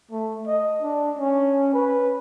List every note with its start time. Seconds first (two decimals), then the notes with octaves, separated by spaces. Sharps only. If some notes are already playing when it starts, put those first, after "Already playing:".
0.11 A3
0.47 D#5
0.82 D4
1.19 C#4
1.73 B4